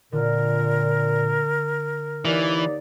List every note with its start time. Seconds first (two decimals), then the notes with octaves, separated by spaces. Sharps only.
0.12 A#2 D3 A#4
2.25 D#2 E3 D#4 D5